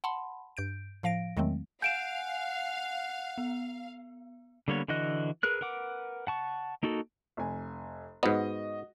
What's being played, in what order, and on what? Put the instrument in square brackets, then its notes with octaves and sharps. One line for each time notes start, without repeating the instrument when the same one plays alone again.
[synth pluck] F#5 A5 B5 C6
G2 G6 D7
A2 F3 F5 A#6 D7
E2 D#3 F#3 G#3 A3 C4
[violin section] F5 [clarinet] F#5 [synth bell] G#5 [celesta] G6 D7 E7
[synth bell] B3
[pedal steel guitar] D3 G3 A#3 B3 C#5
D3 E3 F#4 D#5 F#6
G#4 A#4 B4 F#6
A#4 B4 F#5 D6
F#5 A5 C#6
A#3 D#4 F#4 A4
[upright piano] F1 G#5
[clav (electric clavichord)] G#2 B3 [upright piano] F#4 D#5